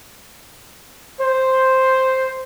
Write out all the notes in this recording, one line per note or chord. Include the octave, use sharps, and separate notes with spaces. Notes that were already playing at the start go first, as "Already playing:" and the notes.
C5